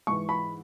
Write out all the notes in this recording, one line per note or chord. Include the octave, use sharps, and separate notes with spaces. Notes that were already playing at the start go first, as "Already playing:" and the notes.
G#2 E3 C#6
B5